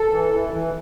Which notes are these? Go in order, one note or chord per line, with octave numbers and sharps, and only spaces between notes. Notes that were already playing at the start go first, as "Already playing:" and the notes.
Already playing: A4
E3
E3
E3